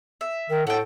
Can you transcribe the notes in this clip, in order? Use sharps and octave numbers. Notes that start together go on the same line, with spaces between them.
E5
D#3 A#4
A2 F#4 A4 G5